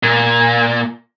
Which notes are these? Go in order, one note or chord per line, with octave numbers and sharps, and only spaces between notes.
A#2